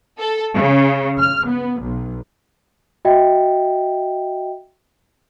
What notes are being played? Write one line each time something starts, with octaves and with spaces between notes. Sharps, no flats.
A4
C#3
F6
B3
B1
F#4 D#5 E5 G5